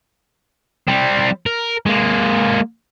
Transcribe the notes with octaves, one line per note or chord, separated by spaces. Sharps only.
G3 C4
A#4
G#3 A#3